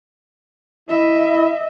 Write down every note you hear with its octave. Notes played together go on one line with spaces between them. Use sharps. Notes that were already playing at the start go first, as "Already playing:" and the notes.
E4 D#5 E5